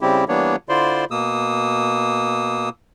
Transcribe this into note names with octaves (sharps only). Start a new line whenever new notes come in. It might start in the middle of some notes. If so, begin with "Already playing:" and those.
C#3 G3 C4 E4 G4
E3 G3 A#3 B3 D4 C#5
D3 E4 F4 C5 D5 C6
B2 A#3 D#6 E6